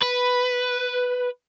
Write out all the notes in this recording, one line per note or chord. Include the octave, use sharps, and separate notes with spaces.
B4